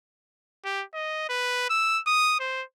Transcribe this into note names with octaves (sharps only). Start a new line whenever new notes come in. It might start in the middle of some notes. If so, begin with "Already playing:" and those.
G4
D#5
B4
E6
D#6
C5